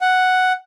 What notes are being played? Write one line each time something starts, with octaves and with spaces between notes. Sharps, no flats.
F#5